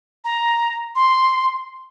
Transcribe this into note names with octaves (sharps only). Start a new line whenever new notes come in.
A#5
C6